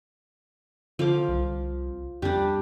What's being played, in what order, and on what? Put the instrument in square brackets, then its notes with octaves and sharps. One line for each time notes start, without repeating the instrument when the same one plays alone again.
[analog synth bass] D3 [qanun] F3 F5 D6
[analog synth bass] C2
[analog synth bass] F2 [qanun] G3 D4